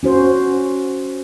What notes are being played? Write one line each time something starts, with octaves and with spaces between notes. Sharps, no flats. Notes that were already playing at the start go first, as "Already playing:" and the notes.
C#4 F#4 C5